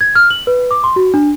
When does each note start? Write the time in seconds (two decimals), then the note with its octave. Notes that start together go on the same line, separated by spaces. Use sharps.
0.01 G#6
0.15 F6
0.30 F#7
0.47 B4
0.71 D6
0.84 C6
0.96 F#4
1.14 D4